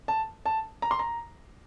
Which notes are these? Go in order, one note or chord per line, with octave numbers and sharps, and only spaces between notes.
A5
A5
A#5
C6
A#5